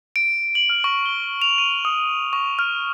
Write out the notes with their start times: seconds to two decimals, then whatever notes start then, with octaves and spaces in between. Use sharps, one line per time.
0.16 D7
0.55 F#7
0.70 F6
0.84 C#6
1.06 G7
1.42 F7
1.58 D#7
1.85 D#6
2.33 C#6
2.59 F6